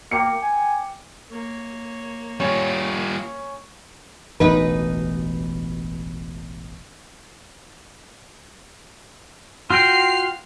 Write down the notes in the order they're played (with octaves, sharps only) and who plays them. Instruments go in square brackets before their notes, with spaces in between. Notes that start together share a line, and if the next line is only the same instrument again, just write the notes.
[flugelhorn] A#3 [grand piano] G5 D6 C#7
[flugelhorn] G#5
[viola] A#3 C#5
[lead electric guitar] G3 F4 [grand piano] C#4
[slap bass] E1 A1 D2 [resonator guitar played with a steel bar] D#4 B4
[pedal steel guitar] F4 F#4 G5 [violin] F6 C7